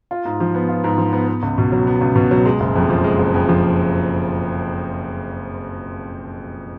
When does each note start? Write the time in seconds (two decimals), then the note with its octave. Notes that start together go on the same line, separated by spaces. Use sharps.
0.11 F4
0.25 G#2
0.40 F3
0.55 B3
0.69 F4
0.84 G#2
0.98 F3
1.13 B3
1.28 B3
1.43 C#2
1.58 B2
1.72 F#3
1.87 B3
2.01 C#2
2.16 B2
2.31 F#3
2.45 G#3
2.60 F#1
2.76 F2
2.90 F3
3.04 G#3
3.19 F#1
3.34 F2
3.49 F3